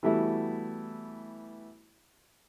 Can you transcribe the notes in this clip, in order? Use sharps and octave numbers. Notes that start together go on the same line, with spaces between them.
E3 G3 A3 B3 E4 F#4